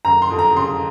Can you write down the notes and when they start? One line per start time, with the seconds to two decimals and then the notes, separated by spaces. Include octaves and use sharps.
0.05 F#1 A#5
0.22 C6
0.30 F2
0.39 A#5
0.56 C#3 C6